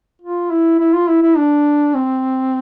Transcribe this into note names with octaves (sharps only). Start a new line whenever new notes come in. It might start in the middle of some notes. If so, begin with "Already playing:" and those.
F4
E4
E4
F4
E4
E4
D4
C4